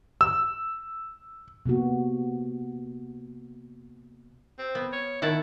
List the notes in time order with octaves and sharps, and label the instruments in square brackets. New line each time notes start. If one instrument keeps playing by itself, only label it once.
[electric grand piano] E6
[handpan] C3 A#3 B3 F#4
[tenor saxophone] C4
[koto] B3
[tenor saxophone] C#5
[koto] D#3 F#5 A5 [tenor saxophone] E4